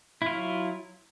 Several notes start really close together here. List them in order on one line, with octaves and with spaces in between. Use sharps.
E4 F4 F#3